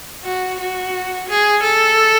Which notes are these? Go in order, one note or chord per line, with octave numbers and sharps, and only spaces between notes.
F#4
F#4
G#4
A4